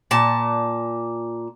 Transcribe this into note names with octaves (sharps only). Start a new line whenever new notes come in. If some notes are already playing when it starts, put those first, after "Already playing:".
A#2 A5